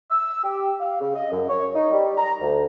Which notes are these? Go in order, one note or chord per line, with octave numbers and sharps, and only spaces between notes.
E6
G4
F5
C#3
D#5
F#2
C#5
D#4
G3
A#5
D2